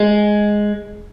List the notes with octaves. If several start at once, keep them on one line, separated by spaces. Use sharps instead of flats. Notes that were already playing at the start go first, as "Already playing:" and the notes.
Already playing: G#3